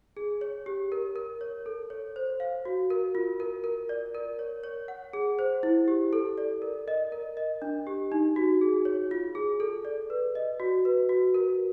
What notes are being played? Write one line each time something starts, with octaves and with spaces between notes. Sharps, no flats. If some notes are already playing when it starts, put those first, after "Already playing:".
G#4
C#5
G4
A#4
A#4
C#5
A4
C#5
C5
F5
F#4
A#4
F4
A#4
A#4
D5
A#4
C#5
C#5
F#5
G#4
C5
E4
G4
A4
D5
A#4
D#5
A#4
D#5
D4
G4
D#4
F#4
G#4
C#5
F4
G#4
A4
D5
B4
D#5
F#4
B4
F#4
A#4